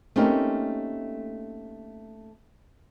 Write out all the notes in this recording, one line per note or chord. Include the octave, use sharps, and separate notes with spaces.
A3 A#3 C4 C#4 D#4 G4